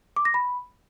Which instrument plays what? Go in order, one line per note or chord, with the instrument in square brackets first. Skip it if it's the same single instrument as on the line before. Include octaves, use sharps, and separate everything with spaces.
[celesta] D6
A#6
B5